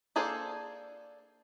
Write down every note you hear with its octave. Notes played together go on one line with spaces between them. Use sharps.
A#3 D4 G#4 A4 C5